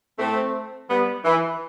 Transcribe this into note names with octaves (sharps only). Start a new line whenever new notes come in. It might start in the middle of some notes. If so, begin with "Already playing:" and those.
A3 C4
G3 B3
E3